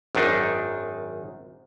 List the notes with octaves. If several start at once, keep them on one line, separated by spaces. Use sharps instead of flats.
G#1 F#2 D#3 D4 D#4